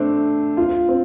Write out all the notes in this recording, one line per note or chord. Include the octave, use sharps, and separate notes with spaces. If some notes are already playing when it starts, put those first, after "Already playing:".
Already playing: A3 C4 D4
F4
C4